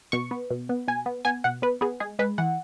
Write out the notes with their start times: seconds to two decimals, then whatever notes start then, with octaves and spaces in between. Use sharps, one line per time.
0.12 B2 C#6
0.31 B3
0.50 B2
0.69 B3
0.88 B2 G#5
1.06 B3
1.25 B3 G#5
1.44 B2 F#5
1.62 B3 B4
1.81 B3 G#4
2.00 G#3 G#4
2.19 G#3 B4
2.38 E3 F#5